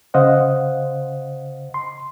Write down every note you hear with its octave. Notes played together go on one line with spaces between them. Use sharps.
C#3 C5 D#5 F5 F#5
C6